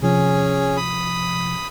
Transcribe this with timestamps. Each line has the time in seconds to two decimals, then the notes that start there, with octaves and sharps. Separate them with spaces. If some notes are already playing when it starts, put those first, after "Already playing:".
0.02 C3 F3 C#4 G#4
0.77 B5 D#6